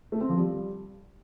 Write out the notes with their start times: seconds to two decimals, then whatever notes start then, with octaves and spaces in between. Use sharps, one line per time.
0.12 A3
0.21 C4
0.29 F3
0.38 G3